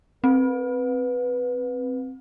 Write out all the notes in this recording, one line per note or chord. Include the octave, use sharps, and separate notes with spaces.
C4 B4